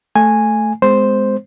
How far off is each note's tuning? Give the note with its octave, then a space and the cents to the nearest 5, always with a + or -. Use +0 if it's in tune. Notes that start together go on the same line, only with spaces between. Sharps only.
A3 +0 G#5 -5
G#3 +0 B3 +45 C5 +0